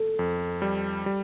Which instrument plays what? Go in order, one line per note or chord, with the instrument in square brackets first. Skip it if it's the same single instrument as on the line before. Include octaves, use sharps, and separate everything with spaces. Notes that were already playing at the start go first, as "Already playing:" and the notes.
Already playing: [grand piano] A4
[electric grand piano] F2
G3
G3